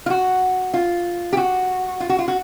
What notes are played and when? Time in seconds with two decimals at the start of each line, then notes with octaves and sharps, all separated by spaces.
0.06 F4
0.10 F#4
0.74 F4
1.33 G4
1.37 F#4
2.00 F4
2.09 F#4
2.19 F4
2.28 F#4